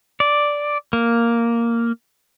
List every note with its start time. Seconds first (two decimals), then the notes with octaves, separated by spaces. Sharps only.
0.20 D5
0.93 A#3